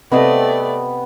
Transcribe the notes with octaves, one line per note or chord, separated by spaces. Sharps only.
C3 A3 B3 C4 D5 D#5